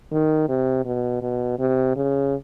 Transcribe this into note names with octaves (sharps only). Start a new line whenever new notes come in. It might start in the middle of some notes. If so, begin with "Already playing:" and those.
D#3
C3
B2
B2
C3
C#3